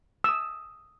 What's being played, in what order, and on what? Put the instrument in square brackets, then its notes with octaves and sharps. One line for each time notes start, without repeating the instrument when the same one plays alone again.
[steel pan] D#6 E6